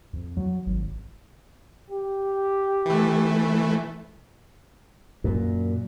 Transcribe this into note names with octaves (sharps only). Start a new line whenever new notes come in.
F2
F#3
G#1
G4
E3 A3
F#2 A#2